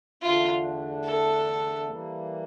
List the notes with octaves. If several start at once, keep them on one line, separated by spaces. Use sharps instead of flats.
E2 D3 A3 D4 F4
A4
E3 G3 A#3